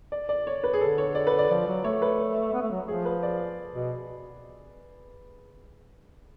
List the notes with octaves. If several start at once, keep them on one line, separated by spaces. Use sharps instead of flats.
D5
D5
C#5
B4
G#4
D3 A4
C#5
D5
B4
D5
F3 D5
F#3
A3 C#5
B4
B3
A3
F#3
F3 G#4
B4
D5
B2